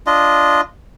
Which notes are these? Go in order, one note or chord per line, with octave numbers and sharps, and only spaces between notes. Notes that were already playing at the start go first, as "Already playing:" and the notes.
D4 F4 D#5